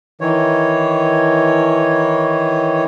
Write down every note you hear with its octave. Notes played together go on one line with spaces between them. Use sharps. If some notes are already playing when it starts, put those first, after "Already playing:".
D#3 E3 C#5